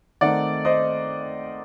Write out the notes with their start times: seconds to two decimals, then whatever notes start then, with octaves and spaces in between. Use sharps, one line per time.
0.21 D#3 A3 C4 D#4 D5 F#5
0.65 C5 D#5